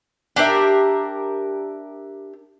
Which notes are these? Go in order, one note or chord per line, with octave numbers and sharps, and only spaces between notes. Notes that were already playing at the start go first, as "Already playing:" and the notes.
D4 G4 A#4 E5